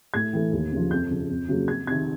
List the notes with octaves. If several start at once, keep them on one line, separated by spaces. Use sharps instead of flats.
A2 G#6
E3 A3
D#2
C#3 F3
F2 G6
C#3 F3
F2
C#3 F#3 A#3
F2 G#6
C3 D#3 G#6